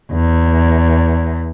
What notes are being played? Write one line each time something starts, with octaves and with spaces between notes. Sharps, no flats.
E2